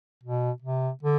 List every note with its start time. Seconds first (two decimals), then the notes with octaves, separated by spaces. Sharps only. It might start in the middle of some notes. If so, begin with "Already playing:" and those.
0.23 B2
0.62 C3
1.03 D3